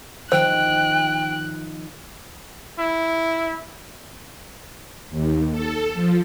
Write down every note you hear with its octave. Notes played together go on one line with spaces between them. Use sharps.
D#3 F3 C5 G5 F#6
E4
D#2
A4
F3